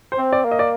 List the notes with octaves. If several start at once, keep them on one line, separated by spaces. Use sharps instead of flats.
C5
C4
D5
A#3
D#5
D5